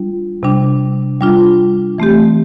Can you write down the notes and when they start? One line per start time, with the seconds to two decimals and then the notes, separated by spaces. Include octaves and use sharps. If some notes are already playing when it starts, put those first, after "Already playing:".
Already playing: G3 D4 F4
0.43 C3 G3 D4
1.21 G3 D4 F4
1.98 E3 A3 C4 G4